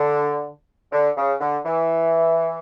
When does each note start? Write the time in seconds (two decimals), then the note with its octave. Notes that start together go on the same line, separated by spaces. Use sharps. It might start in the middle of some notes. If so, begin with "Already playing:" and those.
Already playing: D3
0.92 D3
1.17 C#3
1.41 D3
1.65 E3